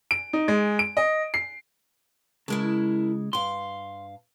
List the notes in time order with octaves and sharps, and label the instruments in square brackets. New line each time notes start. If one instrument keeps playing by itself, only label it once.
[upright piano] D7
D#4
G#3
D7
D#5
C7
[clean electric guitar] C#3 G#3 [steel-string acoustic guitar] E4 A#4 A5
[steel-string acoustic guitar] G2 F5 [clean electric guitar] C6